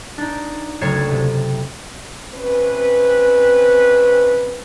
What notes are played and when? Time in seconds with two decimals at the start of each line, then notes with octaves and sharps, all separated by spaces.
0.18 D4 D#4
0.81 F#1 D2 A4 C#5 G#6 C7
1.12 C3
2.34 C3 C4 C#4 B4